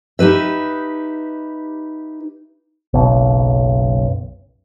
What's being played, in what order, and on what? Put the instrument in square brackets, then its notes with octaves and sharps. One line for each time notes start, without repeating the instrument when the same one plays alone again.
[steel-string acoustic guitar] D#4 G4 B4 E5
[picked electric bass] F#1 B1